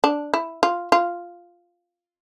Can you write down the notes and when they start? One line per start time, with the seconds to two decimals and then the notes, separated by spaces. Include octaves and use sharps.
0.04 D4
0.34 E4
0.63 F4
0.92 F4